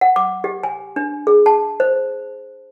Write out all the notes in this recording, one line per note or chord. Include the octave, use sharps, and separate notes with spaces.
F#5
D6
G4
G#5
D4
G#4
A5
C5